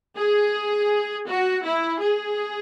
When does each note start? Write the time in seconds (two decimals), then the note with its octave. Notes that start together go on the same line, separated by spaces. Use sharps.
0.18 G#4
1.28 F#4
1.64 E4
2.01 G#4